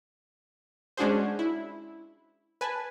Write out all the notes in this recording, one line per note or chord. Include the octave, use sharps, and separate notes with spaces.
G#3 C#4 D4 F#4 G#4 C5
E4
B4 G#5 A5